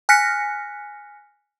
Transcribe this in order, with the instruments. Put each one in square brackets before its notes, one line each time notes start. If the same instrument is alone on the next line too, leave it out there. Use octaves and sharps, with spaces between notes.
[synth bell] G#5 F6 F#6 A#6 B6 C#7